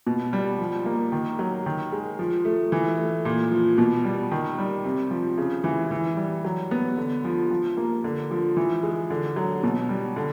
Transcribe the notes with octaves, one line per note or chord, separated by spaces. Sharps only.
B2
G3
F3
A#3
D#3
F#3
D#3
G#3
F3
A3
E3
A3
A#2
F3
B2
G3
D#3
G3
C3
F3
C#3
E3
E3
G3
F#3
B3
D3
F3
F3
A#3
D3
F3
E3
G#3
D3
F#3
B2
G3
D3